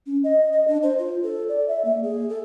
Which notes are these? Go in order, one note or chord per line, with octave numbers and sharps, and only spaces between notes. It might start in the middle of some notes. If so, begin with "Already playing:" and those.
C#4
D#5
D#5
D4
C5
F4
A4
D5
E5
A#3
G#4
A4